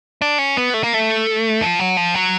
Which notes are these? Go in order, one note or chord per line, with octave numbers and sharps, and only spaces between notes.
D4
C#4
B3
A3
A#3
A3
F3
F#3
F3
F#3